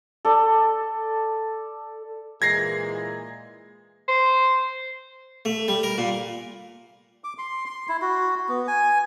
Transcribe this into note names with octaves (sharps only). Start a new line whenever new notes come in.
A4 D5
A#2 E3 G#3 G#6 A#6 C7
C5
A3
G3
A#4
A#2
D6
C6
C6
E4
F#4
B3
G#5